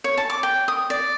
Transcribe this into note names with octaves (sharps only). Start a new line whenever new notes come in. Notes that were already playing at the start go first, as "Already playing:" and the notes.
C#5
A5
D6
G5
D#6
D5